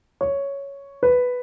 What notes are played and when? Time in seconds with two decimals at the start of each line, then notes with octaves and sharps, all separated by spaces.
0.21 C#5
1.03 B4